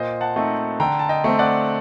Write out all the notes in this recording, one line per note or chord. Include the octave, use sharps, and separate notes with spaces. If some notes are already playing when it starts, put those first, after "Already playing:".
Already playing: A#2 C5 D#5
F#5 A5
A3 C4 D#4
D3 G5 A#5
A5
D#5 G5
A3 C4
D5 F#5